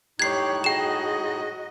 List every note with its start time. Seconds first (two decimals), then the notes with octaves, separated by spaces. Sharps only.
0.19 A2 D#4 G4 C#5 F#6 G#6 C7
0.64 F#4 G#4 D#5 G5 E7